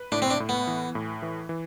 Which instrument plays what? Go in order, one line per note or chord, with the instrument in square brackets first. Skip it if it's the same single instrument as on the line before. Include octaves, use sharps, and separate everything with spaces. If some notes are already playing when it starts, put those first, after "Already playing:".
Already playing: [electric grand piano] B4
[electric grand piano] A2 [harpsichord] D4
[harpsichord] C4
D4
[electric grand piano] A2
[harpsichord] B3
[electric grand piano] E3
A2
E3
E3